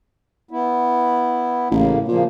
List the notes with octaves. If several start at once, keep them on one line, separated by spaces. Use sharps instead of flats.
B3 E4
A1 A2 C#3 A#3
A#2 C#3 F3 A#3